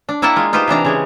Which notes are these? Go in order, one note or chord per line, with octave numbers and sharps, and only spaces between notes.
D4
A#3 E4 E5 F#5 G5 A5
G#3 F4
D#4 F4 G4 B4 C5
C3 E3 D4 A#5
C#3 G#3 G4